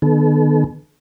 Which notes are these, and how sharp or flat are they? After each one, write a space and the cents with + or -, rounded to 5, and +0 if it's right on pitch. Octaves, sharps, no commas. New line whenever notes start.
D#3 -40 B3 +0 A4 -40